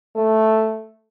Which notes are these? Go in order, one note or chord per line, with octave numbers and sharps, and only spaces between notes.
A3